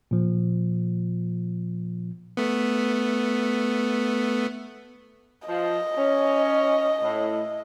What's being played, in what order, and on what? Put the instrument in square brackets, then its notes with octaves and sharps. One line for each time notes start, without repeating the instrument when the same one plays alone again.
[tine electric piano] A#2 F3
[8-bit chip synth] A3 B3
[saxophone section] F3 [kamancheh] D#5
[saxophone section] C#4
A2